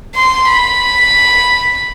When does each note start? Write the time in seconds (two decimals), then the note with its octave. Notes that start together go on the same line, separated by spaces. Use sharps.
0.15 C6
0.48 B5